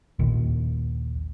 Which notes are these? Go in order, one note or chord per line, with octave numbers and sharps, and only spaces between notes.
A#1 D#2